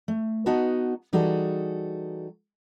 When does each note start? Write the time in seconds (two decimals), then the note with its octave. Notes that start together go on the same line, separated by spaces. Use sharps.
0.08 A3
0.46 B3 D#4 F#4 D#5 A5
1.13 E3 G3 D#4 F#4 G#4 A4